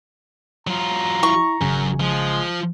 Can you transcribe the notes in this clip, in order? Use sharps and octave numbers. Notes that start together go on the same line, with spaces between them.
F#3 F4 A#5
E4 C#6
G#1 F#2 C#3 G#5
F3 G#3